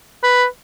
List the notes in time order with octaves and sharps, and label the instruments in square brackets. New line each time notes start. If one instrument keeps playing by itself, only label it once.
[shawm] B4